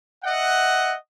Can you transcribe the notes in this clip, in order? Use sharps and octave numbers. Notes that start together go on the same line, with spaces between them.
D#5 E5 F#5